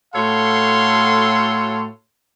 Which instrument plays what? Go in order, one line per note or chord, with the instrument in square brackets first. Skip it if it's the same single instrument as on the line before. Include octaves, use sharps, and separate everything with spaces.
[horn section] A2 F#4 A4 C#5 F5 C6